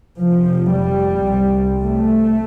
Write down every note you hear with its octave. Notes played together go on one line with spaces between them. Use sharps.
F1 F2 C3 F3
G3
C2 C3
A3